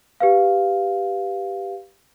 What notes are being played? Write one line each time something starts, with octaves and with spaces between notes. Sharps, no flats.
G4 B4 F5